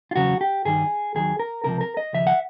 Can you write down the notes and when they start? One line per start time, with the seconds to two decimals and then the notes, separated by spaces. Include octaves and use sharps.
0.11 F4
0.16 E2 C#3 F#3 F#4
0.41 G4
0.65 G2 D#3 G3 G#4
1.15 D#2 D#3 F#3 G#4
1.39 A#4
1.64 C#2 C3 F3 A#4
1.81 A#4
1.97 D#5
2.13 D#2 C#3 F3 E5
2.27 F#5